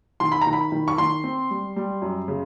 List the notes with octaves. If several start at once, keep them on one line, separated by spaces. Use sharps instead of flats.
D#3 C6
B5
A#5
D#3
B5
D#3
C#6
D#3 C6
C4
G3
G3
F#2
C#3